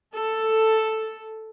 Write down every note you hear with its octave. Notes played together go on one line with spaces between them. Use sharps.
A4